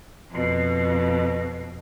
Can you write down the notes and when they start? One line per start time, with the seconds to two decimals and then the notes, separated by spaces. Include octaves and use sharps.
0.31 F2 B2